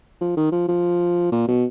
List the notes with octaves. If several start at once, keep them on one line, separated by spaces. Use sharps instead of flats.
F3
D#3
F3
F3
A#2
B2